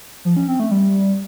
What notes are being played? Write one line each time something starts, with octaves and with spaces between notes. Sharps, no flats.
F3
C#4
C4
A3
G3